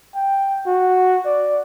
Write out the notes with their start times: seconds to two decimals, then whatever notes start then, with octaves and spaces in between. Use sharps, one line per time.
0.15 G5
0.66 F#4
1.25 D5